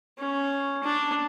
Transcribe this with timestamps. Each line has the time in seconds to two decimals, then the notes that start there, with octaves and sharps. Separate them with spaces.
0.18 C#4
0.83 D4